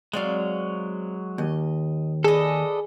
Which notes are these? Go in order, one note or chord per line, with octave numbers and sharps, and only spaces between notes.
F#3 G#3 C4 D5 F5
D#2 D#5
D4 G#4 A4 B4 D#5